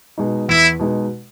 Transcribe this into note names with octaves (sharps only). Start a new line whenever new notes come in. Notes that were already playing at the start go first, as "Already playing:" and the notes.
B2 G#3 D#4
E2 E4
B2 G#3 D#4